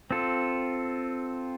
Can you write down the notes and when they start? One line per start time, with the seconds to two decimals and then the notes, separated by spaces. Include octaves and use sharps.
0.11 C4 F4 A4